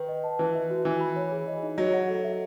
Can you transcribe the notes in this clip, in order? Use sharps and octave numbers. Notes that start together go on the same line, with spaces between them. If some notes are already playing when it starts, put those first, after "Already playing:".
Already playing: D#3 B4
D#5
A5
E3 B4
E5
F#4
E3 G#5
B5
C#5
G#4
D#5
D#4
F#3 D#5
F#5
A4
E5